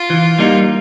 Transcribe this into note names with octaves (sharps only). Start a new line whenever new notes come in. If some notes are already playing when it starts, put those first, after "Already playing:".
Already playing: F4
E3
G3 A#3 D#4